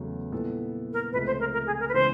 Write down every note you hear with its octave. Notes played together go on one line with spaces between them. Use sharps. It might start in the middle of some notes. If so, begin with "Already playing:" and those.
Already playing: E2 C#3 F#3 A3
A#2 G3 B3 E4 A4
A#4
C#2 C3 F3 A3 B4
C5
A#4
A#4
G#4
A#4
B4
C#3 E3 G#3 B3 C5